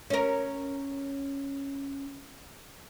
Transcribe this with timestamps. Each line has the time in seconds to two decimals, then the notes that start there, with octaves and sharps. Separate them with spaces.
0.10 C#4 A#4